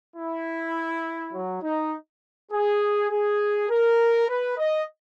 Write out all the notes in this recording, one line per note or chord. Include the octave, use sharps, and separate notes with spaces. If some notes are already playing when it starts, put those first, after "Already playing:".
E4
F#3
D#4
G#4
G#4
A#4
B4
D#5